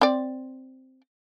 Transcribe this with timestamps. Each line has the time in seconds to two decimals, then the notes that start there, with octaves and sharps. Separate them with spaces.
0.01 C4 D5